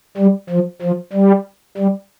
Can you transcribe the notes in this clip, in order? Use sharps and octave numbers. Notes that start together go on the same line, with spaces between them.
G3
F3
F3
G3
G3